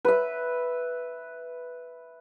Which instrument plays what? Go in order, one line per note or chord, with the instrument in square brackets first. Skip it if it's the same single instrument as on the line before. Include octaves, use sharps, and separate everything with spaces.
[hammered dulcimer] B4 E5